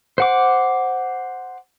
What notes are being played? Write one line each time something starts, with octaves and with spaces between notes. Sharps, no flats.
C5 F#5 D6